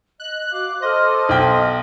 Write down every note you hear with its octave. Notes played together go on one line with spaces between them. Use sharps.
D#5 F#6
F#4 F5 D6
A4 C5 D#5 D6 F6
B1 G5